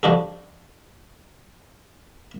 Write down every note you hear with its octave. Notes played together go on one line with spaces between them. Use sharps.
F3 G3 D4 F#4 A4